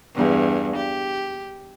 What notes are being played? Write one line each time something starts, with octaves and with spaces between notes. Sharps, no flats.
E2 G2
G4